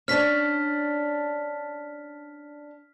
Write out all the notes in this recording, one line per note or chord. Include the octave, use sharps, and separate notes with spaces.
C#4 D4 F6 B6